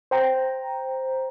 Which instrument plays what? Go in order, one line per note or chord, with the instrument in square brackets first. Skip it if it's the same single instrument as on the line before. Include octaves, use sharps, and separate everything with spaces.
[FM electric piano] C5 G5 A#5